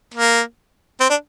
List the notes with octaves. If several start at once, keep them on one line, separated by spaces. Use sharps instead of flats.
A#3
C4
D4